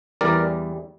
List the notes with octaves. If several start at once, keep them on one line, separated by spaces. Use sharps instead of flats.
E2 E3 G3 A#4 D5